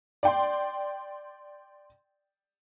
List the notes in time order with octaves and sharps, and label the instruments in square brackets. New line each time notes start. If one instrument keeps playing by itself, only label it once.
[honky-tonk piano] D5 G5 C6